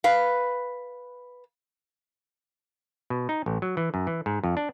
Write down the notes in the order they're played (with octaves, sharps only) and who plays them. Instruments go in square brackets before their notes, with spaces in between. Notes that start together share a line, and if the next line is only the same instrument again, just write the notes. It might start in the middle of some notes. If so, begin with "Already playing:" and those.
[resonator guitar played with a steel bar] B4 F5
[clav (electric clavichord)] B2
D#4
A1
F#3
E3
F#2
E3
G#2
F2
D4